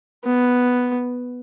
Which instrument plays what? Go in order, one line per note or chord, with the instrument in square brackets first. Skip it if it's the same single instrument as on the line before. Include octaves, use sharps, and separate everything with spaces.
[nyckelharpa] B3